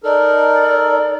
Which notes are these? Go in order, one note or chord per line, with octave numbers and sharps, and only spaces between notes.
D#4 A4 A#4 D5